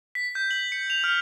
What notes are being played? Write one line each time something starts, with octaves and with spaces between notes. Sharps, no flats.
B6
G6
F#7
C#7
F7
F6